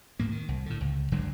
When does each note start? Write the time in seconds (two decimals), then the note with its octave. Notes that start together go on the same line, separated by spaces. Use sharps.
0.19 D2 A2 A#3
0.32 D#3
0.48 C2
0.66 A2 D3
0.81 C#2
1.12 F1 D3 F#3 G#3